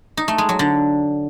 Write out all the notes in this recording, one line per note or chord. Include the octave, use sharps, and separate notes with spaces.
D#4
A3
G#3
F#3
D3